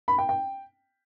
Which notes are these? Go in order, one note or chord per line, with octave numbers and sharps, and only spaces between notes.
B5
G5
G5